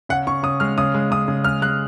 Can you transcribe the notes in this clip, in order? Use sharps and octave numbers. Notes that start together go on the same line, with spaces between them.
C#3 F#5
C#3 C#6
C#3 D#6
G#3 F6
C#3 D#6
G#3
C#3 D#6
C#3
G#3 F6
G#3 F#6